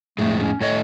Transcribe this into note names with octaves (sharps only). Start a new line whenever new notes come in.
F2 A2 G#3 A3
C#4
A2 A3 C#5 D#5